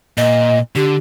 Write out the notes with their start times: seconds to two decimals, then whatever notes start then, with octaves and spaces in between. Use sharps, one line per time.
0.17 A#2 D#5
0.76 D3 G4